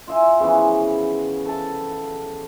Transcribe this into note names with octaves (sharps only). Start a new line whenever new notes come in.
F4 E5 G#5
C#3 E3 F3 B3
A4 A5